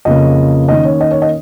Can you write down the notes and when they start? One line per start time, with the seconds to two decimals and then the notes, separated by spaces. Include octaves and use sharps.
0.05 F2 C#3 A#3 D#5
0.68 D#3 A#3 C#4 D#5
0.85 C#5
1.01 D#5
1.11 C#5
1.22 D#5